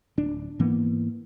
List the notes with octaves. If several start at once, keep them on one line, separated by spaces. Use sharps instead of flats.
D1 D4
G#2 E3 A#3 B3